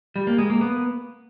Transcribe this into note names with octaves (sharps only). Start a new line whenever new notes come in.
G3
A#3
G#3
A#3
B3